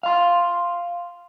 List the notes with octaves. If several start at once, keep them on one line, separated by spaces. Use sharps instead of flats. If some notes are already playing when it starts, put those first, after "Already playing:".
F5 C6